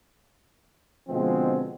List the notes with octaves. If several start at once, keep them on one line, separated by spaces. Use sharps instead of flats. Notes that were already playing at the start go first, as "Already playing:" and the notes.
B2 D3 F3 G#3 B3 C4